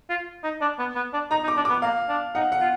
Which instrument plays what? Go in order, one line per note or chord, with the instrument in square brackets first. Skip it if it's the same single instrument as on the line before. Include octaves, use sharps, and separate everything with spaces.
[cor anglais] F4
D#4
D4
B3
B3
D4
[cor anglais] D#4 [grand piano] A#5
[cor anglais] D#4
[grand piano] D6
[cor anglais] D4
[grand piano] D6
[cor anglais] B3
[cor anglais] A#3 [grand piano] F5
[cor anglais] D4
[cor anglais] D#4 [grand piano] F#5
[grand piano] F#5
[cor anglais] F4